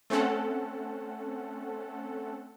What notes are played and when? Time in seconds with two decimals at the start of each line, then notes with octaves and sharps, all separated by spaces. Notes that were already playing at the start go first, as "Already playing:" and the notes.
0.10 A3 C4 C#4 A4 F#5